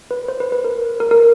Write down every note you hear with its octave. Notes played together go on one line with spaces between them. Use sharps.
B4
C5
B4
B4
A#4
A#4
A#4